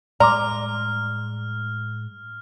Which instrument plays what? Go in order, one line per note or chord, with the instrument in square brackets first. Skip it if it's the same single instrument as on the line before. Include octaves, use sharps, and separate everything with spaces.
[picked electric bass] A2 G3 G#3 [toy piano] D5 C6 D6 [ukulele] A#5 [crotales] F6